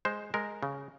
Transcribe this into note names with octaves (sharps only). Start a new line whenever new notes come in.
G#3 C5
G#3 A#4
C#3